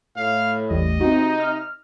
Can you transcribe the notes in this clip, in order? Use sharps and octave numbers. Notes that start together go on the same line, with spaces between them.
A2 F5
A1 E2 G3 D#5
C3 C4 D#4 F#4
F6